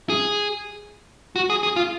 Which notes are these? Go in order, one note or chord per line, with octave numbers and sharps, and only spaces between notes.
G#4
F#4
G#4
G#4
F4